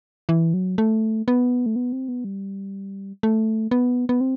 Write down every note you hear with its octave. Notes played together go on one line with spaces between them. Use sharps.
E3
F#3
A3
B3
A3
B3
C4
B3
G3
A3
B3
B3
C4